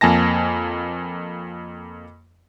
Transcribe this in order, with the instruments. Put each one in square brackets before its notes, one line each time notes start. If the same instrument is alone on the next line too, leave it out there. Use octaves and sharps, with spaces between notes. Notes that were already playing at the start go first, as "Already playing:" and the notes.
[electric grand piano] F2 A#3 G#5 A5 A#6